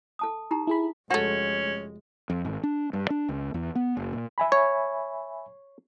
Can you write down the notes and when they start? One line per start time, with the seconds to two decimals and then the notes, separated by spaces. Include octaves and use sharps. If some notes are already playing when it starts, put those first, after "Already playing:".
0.19 A4 A5 D#6
0.51 D#4 G4 A#5
0.67 E4 G#4 B5
1.10 F1 G#3 A3 C#4 F#4
2.30 F2
2.45 G#1
2.63 D4
2.93 G2
3.10 D4
3.29 C#2
3.54 E2
3.76 B3
3.97 F#1
4.13 A#2
4.38 E5 G#5 B5
4.52 C#5